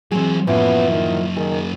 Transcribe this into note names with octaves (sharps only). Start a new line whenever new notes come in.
E3 F#3 C4 G#4
F#2 A2 C#3 E3 F3 B3
D#3
D#3 G#4